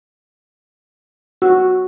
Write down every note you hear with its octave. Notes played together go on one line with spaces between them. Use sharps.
F#4